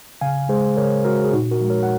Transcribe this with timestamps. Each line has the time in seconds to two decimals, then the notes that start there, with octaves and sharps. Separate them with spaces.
0.21 C#3 F5 G#5
0.49 G#3 G#4 C5
0.77 C#3 A#4 C#5
1.05 G#3 F#4 A#4
1.24 G#4
1.33 A#2 D#4 F#4
1.51 F#4 A#4
1.61 F3 G#3
1.70 A#4 C#5
1.83 F#5